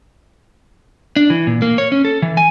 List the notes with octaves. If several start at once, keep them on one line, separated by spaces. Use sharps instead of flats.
D4
E3
A#2
A#3
C#5
C#4
A4
E3
G#5